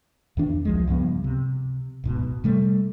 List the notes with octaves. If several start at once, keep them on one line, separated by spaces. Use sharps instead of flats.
E2 D#3 D4
C2 F3 G#3
C#2 G2 F3 B3
C3
D1 G#2 B2
C3 G3 A3